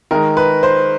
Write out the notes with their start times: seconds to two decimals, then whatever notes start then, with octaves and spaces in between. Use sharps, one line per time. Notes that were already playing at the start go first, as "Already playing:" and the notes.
0.11 D#3 G#3 A#4
0.37 B4
0.63 C5